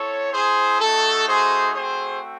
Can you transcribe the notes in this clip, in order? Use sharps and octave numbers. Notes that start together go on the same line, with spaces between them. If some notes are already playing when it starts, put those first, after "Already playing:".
Already playing: C4 E4 A4 C#5
G#4 C5
A3 D#4 F#4 A4
G#4 C5
A3 C4 F#4 G#4 C5